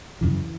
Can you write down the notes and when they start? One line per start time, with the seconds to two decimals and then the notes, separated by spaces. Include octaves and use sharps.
0.21 F#2 C#3 E3